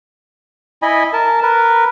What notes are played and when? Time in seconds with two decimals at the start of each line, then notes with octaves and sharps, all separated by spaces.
0.82 E4 D#5 G#5 B5
1.13 A#4 A5
1.43 A#4 B4